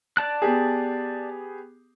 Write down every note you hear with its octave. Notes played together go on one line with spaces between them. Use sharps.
D5 A5 F#6
B3 G4 G#4